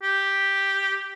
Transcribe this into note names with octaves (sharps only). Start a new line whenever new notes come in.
G4